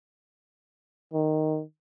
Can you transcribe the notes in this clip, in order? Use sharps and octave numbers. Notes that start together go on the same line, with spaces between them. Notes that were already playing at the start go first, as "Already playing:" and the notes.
D#3